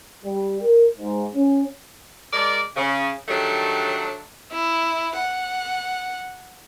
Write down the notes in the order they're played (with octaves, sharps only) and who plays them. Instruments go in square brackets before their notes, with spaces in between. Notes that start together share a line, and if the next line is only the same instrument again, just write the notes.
[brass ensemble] G3
A#4
G#2
C#4
[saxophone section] G#3 A#4 D5
C#3
D#3 F#3 G3 A3 D4
[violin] E4
F#5